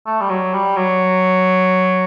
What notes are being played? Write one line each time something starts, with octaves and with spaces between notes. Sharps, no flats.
A3
G3
F#3
G3
F#3